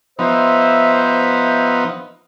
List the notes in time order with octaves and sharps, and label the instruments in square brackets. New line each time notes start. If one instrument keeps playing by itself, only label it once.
[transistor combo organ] F3 B3 D#4 [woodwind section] C5 E5